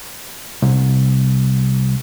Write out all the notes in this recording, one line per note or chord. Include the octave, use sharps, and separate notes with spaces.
C2